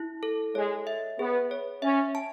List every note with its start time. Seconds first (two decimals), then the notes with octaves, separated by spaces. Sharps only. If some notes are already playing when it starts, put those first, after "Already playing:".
Already playing: E4
0.23 A4
0.55 G#3 C#5
0.87 E5
1.19 B3 G#4
1.51 C#5
1.82 C#4 E5
2.15 A5